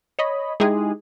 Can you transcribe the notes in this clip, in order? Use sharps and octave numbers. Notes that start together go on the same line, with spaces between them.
C#5 D#5 B5
G#3 D#4 E4 G4 G#4